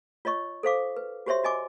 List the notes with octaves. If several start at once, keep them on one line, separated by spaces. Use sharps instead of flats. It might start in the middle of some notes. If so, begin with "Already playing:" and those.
F4 C#5 D#5 C#6
A4 C5 F5 D6
B4
F#4 G4 C5 C#5 E5 C6
F#4 D#5 G#5 D6